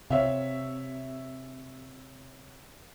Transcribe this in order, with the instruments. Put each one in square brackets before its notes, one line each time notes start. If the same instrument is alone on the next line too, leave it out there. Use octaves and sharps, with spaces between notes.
[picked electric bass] C3 [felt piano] C#5 E5 F5